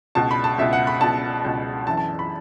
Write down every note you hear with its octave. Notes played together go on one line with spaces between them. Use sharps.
C#2 B2 A5
B5
A5
C#2 B2 E5
F#5
B5
C#2 B2 A5
C#2 B2
F#2 E3 A5
A5
B5